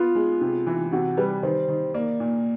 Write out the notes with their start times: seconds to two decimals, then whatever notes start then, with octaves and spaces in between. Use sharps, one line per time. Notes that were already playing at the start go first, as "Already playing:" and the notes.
Already playing: B3 F4
0.15 G#3
0.41 C3
0.67 E3
0.92 C3 F#4
1.17 G3 B4
1.43 D#3 C5
1.69 D#3
1.94 A#3 D5
2.20 A#2